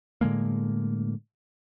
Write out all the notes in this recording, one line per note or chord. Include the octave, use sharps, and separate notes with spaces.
A2 D3 G#3 A#3